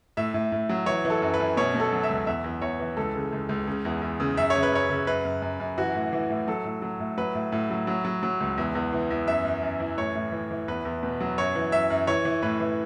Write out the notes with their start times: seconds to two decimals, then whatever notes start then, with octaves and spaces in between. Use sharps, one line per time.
0.17 A2 E5
0.34 A2
0.52 A2
0.69 F#3
0.86 E3 C#5
1.05 E3
1.10 A4
1.22 F#2
1.34 B4
1.40 F#2
1.57 B2 C#5
1.74 B2
1.80 A4
1.93 F#3
2.03 E5
2.09 C#2
2.27 E2 E5
2.44 E2
2.62 E2 C#5
2.79 E3
2.97 C#2 A4
3.15 C#3
3.33 C#2
3.49 C#2
3.67 C#3
3.85 E2
4.02 E2
4.20 C#3
4.37 F#2 E5
4.50 C#3 C#5
4.63 B4
4.72 F#2 C#5
4.90 C#3
5.07 F#2 B4
5.25 F#2
5.42 F#2
5.60 F#2
5.78 E3 F#4
5.95 A2
6.13 E3
6.30 A2
6.47 F#3 A4
6.65 A2
6.82 F#3
7.00 A2
7.17 F#3 B4
7.35 A2
7.52 A2
7.70 F#3
7.87 F#3
8.05 F#3
8.23 F#3
8.40 C#2
8.58 E2
8.75 E2
8.93 E3
9.11 E2
9.27 F#2 E5
9.45 F#2
9.63 F#2
9.80 E3
9.97 A2 C#5
10.15 A2
10.32 E3
10.51 E3
10.68 E2 B4
10.85 E2
11.03 B2
11.20 F#3
11.38 F#2 C#5
11.55 E3
11.72 F#2 E5
11.90 F#2
12.07 E3 C#5
12.25 E3
12.42 A2 B4
12.60 E3